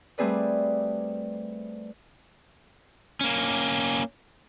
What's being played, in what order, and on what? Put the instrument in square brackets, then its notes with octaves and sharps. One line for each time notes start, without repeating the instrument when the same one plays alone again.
[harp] G3 A3 C4 G#4 B4 D5
[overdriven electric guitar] A#3 C#4